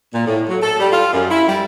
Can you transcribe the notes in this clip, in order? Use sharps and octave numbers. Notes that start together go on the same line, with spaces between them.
A#2
A2
F#3
A4
G3
F4
F#2
E4
G3